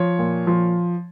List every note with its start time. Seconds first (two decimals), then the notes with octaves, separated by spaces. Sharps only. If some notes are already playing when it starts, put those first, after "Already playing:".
Already playing: F3 C#5
0.19 A#2
0.47 F3